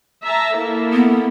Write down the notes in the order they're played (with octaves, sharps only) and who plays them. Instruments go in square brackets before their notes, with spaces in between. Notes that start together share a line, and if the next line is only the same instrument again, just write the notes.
[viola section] E5 A5 A#5
A#3 E4 A4
[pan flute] B3